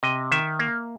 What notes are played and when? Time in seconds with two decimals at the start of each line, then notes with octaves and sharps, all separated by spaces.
0.03 C3 D#5
0.32 D#3 E5
0.59 A#3